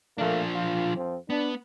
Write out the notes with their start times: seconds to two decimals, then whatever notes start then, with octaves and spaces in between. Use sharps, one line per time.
0.18 F3 A3 A#3 D4
0.54 F4
0.95 F2 F3 C4
1.30 B3 D4